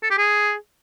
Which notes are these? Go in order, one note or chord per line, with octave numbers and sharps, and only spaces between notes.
A4
G4
G#4